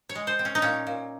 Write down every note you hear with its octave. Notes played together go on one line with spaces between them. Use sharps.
C#5
G#3
C5
C4
C#4
D#4
A#2 C#4
A#2